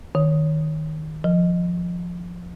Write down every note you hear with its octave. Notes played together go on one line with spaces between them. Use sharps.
D#3
F3